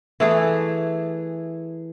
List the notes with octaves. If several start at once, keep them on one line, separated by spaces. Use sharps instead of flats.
E3 A3 G#4